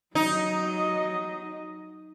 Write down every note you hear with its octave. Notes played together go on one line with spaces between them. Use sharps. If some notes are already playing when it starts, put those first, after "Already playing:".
F#3 D#4 D#5